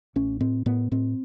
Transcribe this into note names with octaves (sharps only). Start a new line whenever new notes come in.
A1 C#4
A2 C4
A2 B3
A2 C4